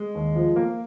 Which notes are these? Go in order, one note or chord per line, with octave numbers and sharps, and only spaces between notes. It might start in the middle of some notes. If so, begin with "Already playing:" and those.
Already playing: G#3
D#2
F3
A#3